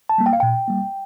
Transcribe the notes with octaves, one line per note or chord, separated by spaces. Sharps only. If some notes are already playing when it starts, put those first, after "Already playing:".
A5
G3 A#3
G5
F5
A#2 G5
G3 A#3